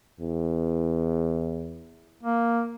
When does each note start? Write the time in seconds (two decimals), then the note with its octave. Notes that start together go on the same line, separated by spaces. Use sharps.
0.20 E2
2.23 A#3